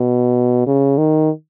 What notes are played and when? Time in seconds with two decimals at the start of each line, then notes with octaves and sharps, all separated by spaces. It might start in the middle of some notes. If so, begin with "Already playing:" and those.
Already playing: B2
0.67 C#3
0.98 D#3